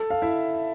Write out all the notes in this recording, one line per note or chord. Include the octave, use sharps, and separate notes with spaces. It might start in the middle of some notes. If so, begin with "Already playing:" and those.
Already playing: A4 A5
F5
E4 E5